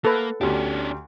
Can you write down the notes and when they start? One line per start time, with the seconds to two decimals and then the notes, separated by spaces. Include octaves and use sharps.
0.05 A#3 A4 B4
0.41 D2 C#4 D4 G4